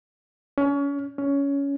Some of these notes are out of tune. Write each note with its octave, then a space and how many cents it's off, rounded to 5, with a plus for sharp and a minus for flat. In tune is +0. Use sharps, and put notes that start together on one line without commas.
C#4 +30
C#4 +15